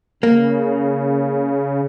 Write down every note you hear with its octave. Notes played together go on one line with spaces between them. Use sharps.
C#3 A#3